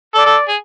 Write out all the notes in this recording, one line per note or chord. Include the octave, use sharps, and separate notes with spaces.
A4 D5
A4
G#4